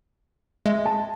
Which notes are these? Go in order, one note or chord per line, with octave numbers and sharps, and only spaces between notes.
G#3 E5
A5